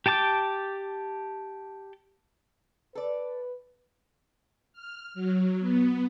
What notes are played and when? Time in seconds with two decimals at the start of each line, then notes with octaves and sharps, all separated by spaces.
0.06 G4 G5 A5 D6 G6
2.95 A4 B4 D5
4.73 F6
5.14 F#3
5.60 B3